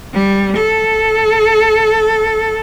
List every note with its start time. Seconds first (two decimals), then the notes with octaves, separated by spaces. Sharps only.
0.14 G3
0.57 A4